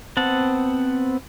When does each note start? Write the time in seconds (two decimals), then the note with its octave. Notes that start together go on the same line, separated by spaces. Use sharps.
0.17 B3 C4 F#5 A5